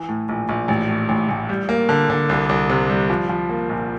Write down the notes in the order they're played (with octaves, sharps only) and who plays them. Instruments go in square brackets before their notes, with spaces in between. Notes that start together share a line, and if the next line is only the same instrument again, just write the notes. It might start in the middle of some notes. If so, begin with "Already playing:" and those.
Already playing: [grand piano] E3
A2
A#1
A#1
A1
A2
A1
A1
G3
A#3
D3
D3
C2
C2
C3
G3
F3
F3
A#3
A#1